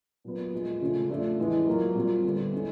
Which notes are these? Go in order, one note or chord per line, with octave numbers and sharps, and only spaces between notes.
A#2 F#3 B3
A#2 F3 G#3
C#3 F3 A3 C#4
F3 A3 D4
A2 E3 G#3
A#2 F#3 A#3
A#2 G3 C4
D3 G3 B3
G#3 C#4 E4 A4